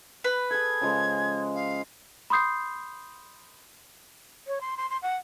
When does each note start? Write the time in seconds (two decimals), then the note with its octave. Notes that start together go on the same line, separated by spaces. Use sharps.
0.24 B4
0.51 G#4 A4 G#6
0.81 C#3 F3 G#3
1.55 F5
2.30 B5 C6 D#6 G6 C7
4.47 C#5
4.61 C6
4.77 C6
4.90 C6
5.02 F#5